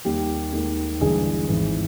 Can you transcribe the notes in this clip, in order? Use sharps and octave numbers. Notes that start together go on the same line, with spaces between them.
D#2 D#3 G3 G4
D#2 D#3 G#3
G1 G2 E3 G#3 G#4
G#1 G#2 E3